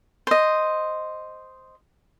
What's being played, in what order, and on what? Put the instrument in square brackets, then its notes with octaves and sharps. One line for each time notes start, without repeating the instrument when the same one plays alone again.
[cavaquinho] C5 D#5